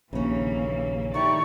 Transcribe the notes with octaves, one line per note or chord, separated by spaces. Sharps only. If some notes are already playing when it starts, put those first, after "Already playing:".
A#1 D#2 C#3 E3 A#3 C#4
D#3 A3 E4 G4 D5 C#6